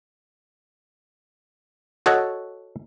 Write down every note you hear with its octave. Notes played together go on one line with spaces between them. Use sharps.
F#4 A4 C#5 D#5 F#5